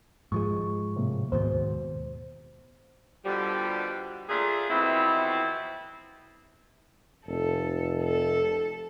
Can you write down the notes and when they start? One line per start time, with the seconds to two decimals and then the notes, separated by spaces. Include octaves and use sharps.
0.32 G#2 F3 G#3 C#6
0.96 A2 C3 A#3
1.32 D#2 G#2 B2 C5
3.25 B2 D3 F3 G3
4.29 A3 A#3 D4 F4 G#4
4.70 F2 B2 E3 B3 C4 E4
7.27 F1 A4
8.03 A4